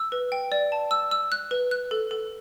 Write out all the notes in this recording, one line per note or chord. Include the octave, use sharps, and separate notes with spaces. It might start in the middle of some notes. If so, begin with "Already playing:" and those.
Already playing: E6
B4
G5
D5
A5
E6
E6
F#6
B4
F#6
A4
A4